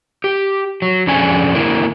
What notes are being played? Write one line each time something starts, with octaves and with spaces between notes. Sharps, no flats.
G4
F#3
F2 D3 C#4 G#4 D5 G#5
D3 A#3 C4 D4 E4 A#4